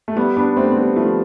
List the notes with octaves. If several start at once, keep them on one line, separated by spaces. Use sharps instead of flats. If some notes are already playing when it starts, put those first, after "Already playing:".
A3
G3 B3
B3 D4
A3 C4
C4
G3 B3
F3 A3